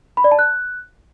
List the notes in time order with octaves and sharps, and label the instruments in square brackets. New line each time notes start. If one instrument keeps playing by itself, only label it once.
[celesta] B5
D5
A5
F#6